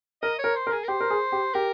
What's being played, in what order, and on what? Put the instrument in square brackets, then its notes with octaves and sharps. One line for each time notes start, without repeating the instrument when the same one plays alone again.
[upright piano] A#4 [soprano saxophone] D#5
[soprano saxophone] C#5
[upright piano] A#4
[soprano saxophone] C5
[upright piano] A#4
[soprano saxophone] G#4
A#4
[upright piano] G4 [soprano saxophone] C5
[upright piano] A#4
G#4
G4
[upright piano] G4 [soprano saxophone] A#4